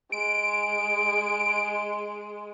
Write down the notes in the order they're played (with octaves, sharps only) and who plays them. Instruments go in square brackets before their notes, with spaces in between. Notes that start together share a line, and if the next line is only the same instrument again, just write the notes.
[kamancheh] G#3 [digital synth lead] D7